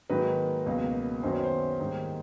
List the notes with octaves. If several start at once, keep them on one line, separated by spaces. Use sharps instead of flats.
G#2 D#3 F#3 A#3 B4
C#2 B2 F#3 A#3
F#2 D#3 F#3 B3 C5
C#5
C5
G#2 D#3 G3 A#3